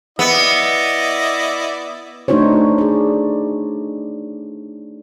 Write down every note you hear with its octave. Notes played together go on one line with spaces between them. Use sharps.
B3 E4 D5 D#5
A3 D4 D#4 F#4 C5 C#5
G#4 D5